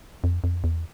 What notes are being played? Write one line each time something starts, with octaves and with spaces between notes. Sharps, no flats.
F2
F2
E2